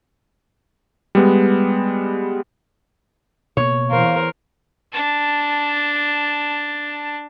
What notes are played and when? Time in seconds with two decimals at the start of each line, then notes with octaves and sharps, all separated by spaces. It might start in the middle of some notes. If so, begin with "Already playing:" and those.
1.15 G3 G#3 B3
3.57 B2 A#3 C#5
3.91 E2 A#4 C5 F5
4.92 D4 A5